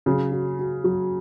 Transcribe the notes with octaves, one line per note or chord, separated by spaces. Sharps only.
C#3 F#3
F#4
F#4
F#3